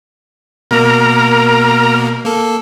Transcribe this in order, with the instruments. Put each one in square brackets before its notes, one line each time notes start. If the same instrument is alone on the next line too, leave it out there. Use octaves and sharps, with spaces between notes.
[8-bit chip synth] B2 A#3 [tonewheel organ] A#4 A#5
[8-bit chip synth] A#3 A4